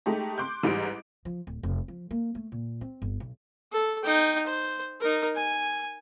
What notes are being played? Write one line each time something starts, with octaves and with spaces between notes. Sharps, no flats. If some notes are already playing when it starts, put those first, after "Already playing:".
G#3 A3 D#4 G4
C6 D6 F#6 G6
A1 G#2 G3 D#4 D7
F3
D1
F1
F3
A#3
A3
A#2
C4
G1
B1
A4
D#4 G5
C5
D#4 A#4
G#5